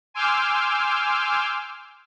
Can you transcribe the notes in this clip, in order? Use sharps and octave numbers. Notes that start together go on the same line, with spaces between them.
G#5 C6 D6 E6 F6 G6